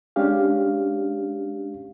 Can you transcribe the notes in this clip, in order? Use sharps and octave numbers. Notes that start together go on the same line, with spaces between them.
G#3 C#4 D4 G4 F5